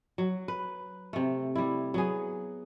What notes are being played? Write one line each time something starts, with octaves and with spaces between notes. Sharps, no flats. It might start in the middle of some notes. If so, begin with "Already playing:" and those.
F#3
B4
C3 A3
G3 E4
F#3 B3 G#4